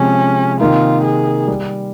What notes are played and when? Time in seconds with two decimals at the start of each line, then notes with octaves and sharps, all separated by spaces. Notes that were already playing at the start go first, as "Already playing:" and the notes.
Already playing: C3 F3 G#3 C4 C#4
0.60 C3 D#3 A#3 D#4 F4 A#4
1.04 G#4
1.47 G3